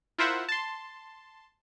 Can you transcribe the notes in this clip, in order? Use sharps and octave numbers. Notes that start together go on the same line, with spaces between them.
E4 F4 A#4 C5 E5 F#5
A5 C6